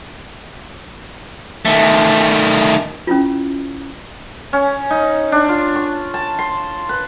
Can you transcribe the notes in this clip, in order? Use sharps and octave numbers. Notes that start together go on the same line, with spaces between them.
D#3 A3
C#4 E4 F4
C#4
D#4
D4
F4
C#6
A5
C6
B4